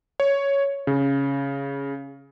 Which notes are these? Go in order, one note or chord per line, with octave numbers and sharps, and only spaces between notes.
C#5
C#3